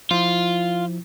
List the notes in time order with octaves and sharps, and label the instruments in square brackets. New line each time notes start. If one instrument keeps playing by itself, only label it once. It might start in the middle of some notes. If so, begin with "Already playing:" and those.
[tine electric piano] F3 E4 [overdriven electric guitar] F4